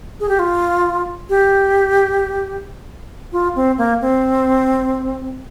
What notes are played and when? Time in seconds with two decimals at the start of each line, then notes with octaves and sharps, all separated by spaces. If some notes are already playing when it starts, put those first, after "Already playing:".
0.20 G#4
0.29 G4
0.39 F4
1.29 G4
3.32 F4
3.56 C4
3.78 A#3
4.01 C4